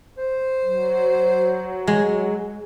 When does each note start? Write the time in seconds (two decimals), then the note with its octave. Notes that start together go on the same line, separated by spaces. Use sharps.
0.18 C5
0.64 F#3
1.87 G#3